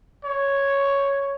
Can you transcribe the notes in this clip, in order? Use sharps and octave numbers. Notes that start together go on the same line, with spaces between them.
C#5